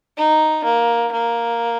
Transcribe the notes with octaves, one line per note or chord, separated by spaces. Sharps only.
D#4
A#3
A#3